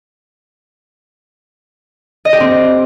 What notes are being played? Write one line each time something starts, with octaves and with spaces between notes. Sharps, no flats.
D#5
G4
C4